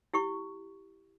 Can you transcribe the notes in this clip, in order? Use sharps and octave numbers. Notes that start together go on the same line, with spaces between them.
E4 G4 C#6